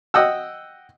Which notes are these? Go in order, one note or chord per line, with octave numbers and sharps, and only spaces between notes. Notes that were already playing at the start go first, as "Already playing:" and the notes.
D#5 F#5 G5 E6